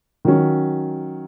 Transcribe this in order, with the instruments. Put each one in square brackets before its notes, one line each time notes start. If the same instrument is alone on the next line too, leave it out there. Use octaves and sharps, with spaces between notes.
[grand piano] D#3 F#3 C#4